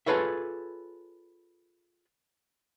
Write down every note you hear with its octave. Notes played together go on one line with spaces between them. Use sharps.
F4 G#4 A4 B4 C#5 E5